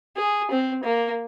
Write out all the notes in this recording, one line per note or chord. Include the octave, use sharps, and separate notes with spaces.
G#4
C4
A#3